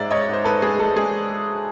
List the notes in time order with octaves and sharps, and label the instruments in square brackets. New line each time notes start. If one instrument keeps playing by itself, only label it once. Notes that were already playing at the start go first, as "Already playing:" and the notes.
Already playing: [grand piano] G#2 G#3 D5 E5
G#2 C#5 D#5
G#2 C5
G#2 A4 B4
G#3 G#4
G#3 A4
G#3 G#4